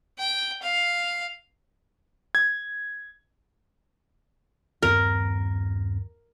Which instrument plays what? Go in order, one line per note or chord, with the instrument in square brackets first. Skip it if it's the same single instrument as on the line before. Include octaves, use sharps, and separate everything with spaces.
[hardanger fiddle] G5
F5
[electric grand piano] G#6
[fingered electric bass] D#1 G2 C4 [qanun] A#4